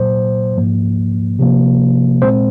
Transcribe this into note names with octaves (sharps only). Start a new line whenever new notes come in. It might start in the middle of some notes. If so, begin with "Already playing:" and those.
Already playing: A#2 F#3 A#3 C5
G#2 F3 A#3
C3 F3 A#3
A#2 G#3 C4 C5